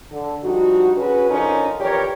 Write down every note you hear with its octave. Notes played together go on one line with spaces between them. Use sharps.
D3
F3 G3 D4 D#4 F#4
C#4 F#4 G#4 B4
D3 F3 C#4 D#4 F4 A#4
F2 E3 G4 A#4 C#5 D5